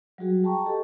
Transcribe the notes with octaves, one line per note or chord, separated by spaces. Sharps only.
F#3 G3 F#4 G#4
G5 A5 A#5 C#6
G4 A4 D#5